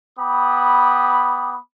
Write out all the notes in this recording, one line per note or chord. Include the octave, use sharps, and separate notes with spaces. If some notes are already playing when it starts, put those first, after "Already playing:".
B3 G5 B5 D6 D#6